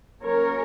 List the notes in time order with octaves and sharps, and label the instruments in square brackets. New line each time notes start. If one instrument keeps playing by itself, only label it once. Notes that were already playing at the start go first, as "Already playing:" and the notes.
[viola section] F#3 A#3 C#4 A#4 C#5